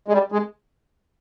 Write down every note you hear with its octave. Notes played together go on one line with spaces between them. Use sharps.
G#3
G3
G#3